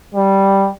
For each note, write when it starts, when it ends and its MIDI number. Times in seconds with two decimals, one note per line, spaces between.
0.15 0.70 55